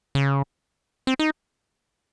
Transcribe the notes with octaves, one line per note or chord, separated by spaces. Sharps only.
C#3
C4
D#4